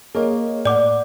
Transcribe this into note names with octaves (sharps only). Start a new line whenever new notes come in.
A#3 G#4 C#5 D#5
A2 D5 F#5 D6